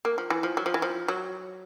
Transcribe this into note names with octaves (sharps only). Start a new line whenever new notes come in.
A#3
F3
E3
F3
F#3
F3
E3
F3
F#3